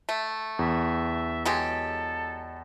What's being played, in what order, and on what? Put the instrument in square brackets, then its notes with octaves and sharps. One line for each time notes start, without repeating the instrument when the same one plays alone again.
[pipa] A3
[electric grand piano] E2 [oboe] E5
[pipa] F#3 G#3 G4 [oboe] A4